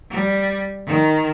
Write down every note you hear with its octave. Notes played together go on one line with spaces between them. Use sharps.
G3
D#3